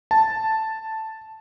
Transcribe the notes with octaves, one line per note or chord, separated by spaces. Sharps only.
A5